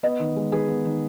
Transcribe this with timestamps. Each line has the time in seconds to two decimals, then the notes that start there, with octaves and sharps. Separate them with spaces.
0.03 B3 B4 D#5
0.20 D#3
0.36 G#3
0.52 D#3 G#4 B4
0.68 B3
0.85 D#3